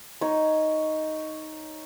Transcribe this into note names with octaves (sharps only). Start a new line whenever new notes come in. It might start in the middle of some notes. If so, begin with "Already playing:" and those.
D#4 C#5